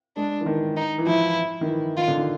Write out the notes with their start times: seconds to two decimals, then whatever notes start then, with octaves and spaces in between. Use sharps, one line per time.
0.17 G#3 D4
0.41 E3
0.46 D#3
0.77 D#4
0.98 E3
1.07 F3 E4
1.61 D#3
1.67 E3
1.97 D#3 F4
2.08 D3
2.18 D#3